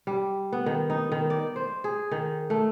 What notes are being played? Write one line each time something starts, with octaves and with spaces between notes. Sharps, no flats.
G3
B3
D#3
D#4
D#3
D5
C5
G#4
D#3
A3